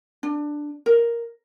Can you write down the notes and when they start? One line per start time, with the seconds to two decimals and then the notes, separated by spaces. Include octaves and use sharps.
0.23 D4
0.86 A#4